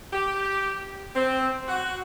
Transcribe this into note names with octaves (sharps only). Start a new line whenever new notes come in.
G4
C4
F#4